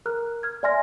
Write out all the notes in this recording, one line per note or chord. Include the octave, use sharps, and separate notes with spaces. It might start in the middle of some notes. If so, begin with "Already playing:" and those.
A#4 A#5 F6 F#6
F6 G#6
D5 E5 G#5 C6 F6 A#6